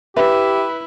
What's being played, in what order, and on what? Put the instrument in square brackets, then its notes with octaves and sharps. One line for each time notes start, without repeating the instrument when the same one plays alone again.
[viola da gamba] E4 [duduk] G4 [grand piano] B4 [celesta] E5